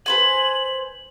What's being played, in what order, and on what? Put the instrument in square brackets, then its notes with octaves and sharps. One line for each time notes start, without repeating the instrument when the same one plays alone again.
[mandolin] B4 C5 G#5 [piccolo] F#7